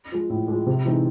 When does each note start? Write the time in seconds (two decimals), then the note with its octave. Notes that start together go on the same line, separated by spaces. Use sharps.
0.12 F3 G#3
0.30 A2
0.48 F3 G#3
0.66 C3
0.85 E3 G#3 C4 D#4